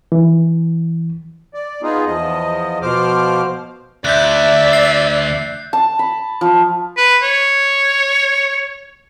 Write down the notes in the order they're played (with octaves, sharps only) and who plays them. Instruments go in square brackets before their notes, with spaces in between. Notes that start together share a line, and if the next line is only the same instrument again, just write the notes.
[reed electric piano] E3
[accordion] D5
B3 D#4 F4 G#4
E2 F3 D#5
B2 F3 C5 D6 F6
[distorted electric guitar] D2 [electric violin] D5 E5 [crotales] F#6 G6
[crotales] C7
[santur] A5
B5
F3
[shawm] B4
C#5